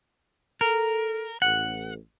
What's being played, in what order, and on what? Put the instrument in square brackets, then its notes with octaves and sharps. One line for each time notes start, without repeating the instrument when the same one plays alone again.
[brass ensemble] A4 [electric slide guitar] A#4
[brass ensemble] A1 [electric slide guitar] F#5